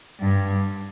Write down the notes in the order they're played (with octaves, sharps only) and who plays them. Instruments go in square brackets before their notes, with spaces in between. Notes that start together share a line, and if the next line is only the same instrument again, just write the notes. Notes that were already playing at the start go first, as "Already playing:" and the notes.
[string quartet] G2